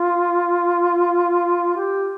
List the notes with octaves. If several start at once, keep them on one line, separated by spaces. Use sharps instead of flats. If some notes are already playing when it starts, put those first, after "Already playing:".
Already playing: F4
G4